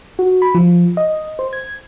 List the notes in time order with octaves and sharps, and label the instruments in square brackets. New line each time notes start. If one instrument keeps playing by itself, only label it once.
[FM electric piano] F#4
B5
F3
D#5
C5
G#6